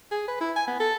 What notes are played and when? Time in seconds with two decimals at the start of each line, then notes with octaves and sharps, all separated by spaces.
0.11 G#4
0.28 B4
0.41 E4
0.56 G#5
0.67 B3
0.80 A4